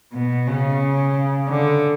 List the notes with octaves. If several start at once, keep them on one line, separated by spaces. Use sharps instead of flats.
B2
C#3
D3